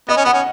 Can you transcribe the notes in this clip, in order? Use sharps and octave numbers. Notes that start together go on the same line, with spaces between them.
B3 D#5
C#4
B3 F#5
C#4